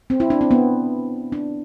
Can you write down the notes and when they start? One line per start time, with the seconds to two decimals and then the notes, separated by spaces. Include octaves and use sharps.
0.10 C4
0.20 E4
0.30 D4
0.41 C4
0.51 B3
1.32 D4